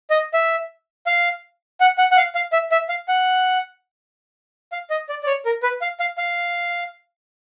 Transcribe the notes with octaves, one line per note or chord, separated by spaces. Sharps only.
D#5
E5
F5
F#5
F#5
F#5
F5
F5
E5
E5
F5
F#5
F5
D#5
D5
D5
C#5
A#4
B4
F5
F5
F5